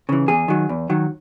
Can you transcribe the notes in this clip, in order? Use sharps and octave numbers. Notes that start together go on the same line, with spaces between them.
C#3 E3
E2 G#4
D#3 F#3
E2
D#3 F#3